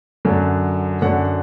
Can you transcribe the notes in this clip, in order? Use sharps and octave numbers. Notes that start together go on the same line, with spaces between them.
F#2 D3 F#3
F#2 D3 F#3 F#5